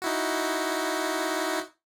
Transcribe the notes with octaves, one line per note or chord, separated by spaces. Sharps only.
D#4 E4 F#4